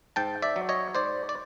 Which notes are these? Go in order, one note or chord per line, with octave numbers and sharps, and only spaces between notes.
G#2 G5 A5
D5 E5
F#3
C#5 D#5
G#2 C5 D5
D5